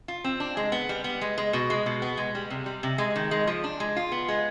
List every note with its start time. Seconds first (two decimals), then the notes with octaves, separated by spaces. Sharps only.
0.08 F4
0.24 C4
0.40 D4
0.57 G#3
0.72 B3
0.89 G3
1.04 B3
1.21 G#3
1.38 G#3
1.53 B2
1.70 G#3
1.86 B2
2.02 B3
2.17 G#3
2.35 G3
2.50 C3
2.66 G3
2.83 C3
2.98 G#3
3.16 D#3
3.31 G#3
3.47 F3
3.64 D4
3.80 G#3
3.96 F4
4.12 B3
4.28 G#3